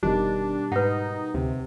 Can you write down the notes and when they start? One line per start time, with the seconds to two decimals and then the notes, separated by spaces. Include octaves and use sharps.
0.03 F1 B2 D#3 G3 D4
0.72 G#2 D#4 B4 F#5
1.34 D2 C3